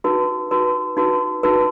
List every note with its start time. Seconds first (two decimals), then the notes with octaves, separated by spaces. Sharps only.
0.04 D#4 F#4 B4
0.51 D#4 F#4 B4
0.97 D#4 F#4 B4
1.43 D#4 F#4 B4